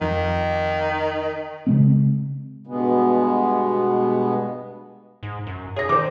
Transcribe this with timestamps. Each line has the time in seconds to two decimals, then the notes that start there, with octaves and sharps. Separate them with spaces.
0.01 F2 D#3
1.67 C#3 G#3 C4
2.67 G2 B2 G#3 B3
5.23 G#2
5.46 F#2
5.76 G#4 C#5 A#6
5.89 D#3 C5 D5 D6